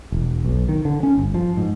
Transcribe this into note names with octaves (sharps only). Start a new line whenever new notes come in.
E1
B1
D#3
D3
C#4
G1
F3
G#2